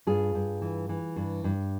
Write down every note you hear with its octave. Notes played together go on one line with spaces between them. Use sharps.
G2 F4 G#4
G2
E3
E3
G2
G2